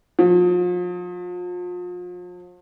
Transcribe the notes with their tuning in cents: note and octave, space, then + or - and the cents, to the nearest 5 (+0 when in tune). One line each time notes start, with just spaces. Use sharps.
F3 +35